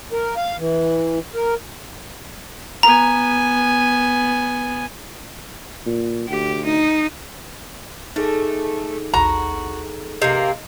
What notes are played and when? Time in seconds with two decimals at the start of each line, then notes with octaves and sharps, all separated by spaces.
0.12 A#4
0.37 F5
0.58 E3
1.34 A#4
2.83 B3 G#5 A#5
5.86 A#2
6.29 D2 G4
6.65 D#4
8.16 A3 D#4 G#4 A4
9.14 A1 D#2 F#4 A#5
10.22 C3 A#3 D#5